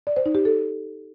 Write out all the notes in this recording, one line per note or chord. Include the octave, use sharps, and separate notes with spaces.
D5
C5
D#4
G4
A4